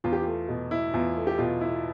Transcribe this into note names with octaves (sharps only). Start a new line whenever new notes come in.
E2 F4
G4
A3 F4
B2
E4
E2 F4
A3
G4
B2 F4
E4